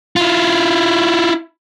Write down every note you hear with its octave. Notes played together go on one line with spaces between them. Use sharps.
E4 F4